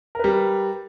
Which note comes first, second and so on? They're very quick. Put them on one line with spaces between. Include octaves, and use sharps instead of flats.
A#4 B4 G3